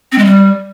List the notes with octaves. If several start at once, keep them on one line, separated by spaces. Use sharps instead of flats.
C4
G#3
G3